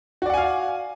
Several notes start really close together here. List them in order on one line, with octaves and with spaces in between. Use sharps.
F#4 D5 F#5 G#5 F5